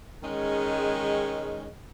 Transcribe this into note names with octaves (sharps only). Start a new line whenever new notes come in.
D#3 G#3 C#4